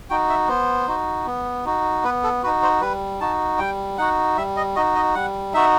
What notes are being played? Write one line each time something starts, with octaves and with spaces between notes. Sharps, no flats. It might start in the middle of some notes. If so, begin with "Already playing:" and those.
D#4 F#4 G5
E5
B3 C5
D#4 F#4
B3
D#4 F#4
B3 B4
A4
D#4 F#4 B4
C5
G3 B4
D#4 F#4 A5
G3 G5
D#4 F#4 F#5
G3 E5
D#5
D#4 F#4 D#5
D#5
G3 F#5
D#4 F#4 E5